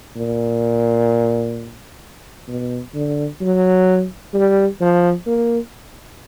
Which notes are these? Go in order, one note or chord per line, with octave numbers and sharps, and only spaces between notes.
A#2
B2
D3
F#3
G3
F3
A#3